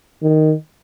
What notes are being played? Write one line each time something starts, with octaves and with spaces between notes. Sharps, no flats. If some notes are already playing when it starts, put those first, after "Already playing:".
D#3